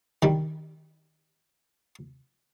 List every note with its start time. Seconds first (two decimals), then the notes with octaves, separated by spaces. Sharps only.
0.22 D#3 G3